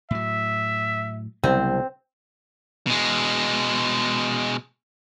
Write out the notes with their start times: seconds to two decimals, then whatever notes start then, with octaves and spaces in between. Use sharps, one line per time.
0.11 A2 F#3 E5
1.44 C2 C#3 F#3 B3 C4
2.87 B2 G#3